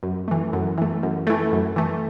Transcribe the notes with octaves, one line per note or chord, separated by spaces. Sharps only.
F#2
E3 A3
F#2
E3 A3
F#2
E3 A3
F#2
E3 A3